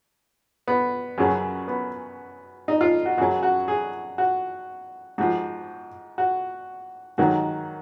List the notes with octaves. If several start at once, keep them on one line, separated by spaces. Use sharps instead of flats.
B3
F#2 C#3 F#3
B3
D#4
F4
F#4
F#2 C#3 F#3 F#4
F#4
G#4
F#4
G#2 F3 F#4
F#4
G#2 D#3 F#3 F#4